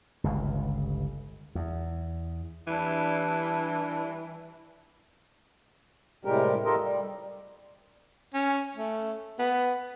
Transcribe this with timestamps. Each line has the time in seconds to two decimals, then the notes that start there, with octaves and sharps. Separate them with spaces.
0.24 G1 C#2
1.55 E2
2.67 E3 G3 D4 E4
6.25 A2 C3 G3 G#3 G4 A#4
6.65 D#4 F4 G4 A4 A#4 D#5
6.83 G3
8.34 C#4
8.75 A3
9.39 B3